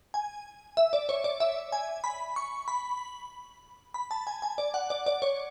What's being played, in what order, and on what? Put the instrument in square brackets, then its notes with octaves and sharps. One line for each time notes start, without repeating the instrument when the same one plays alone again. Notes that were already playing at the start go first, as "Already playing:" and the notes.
[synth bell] G#5
E5
D5
C#5
D5
E5
G#5
B5
C#6
B5
B5
A5
G#5
G#5
D5
F#5
D5
D5
C#5